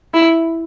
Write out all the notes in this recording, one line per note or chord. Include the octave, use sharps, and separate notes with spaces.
E4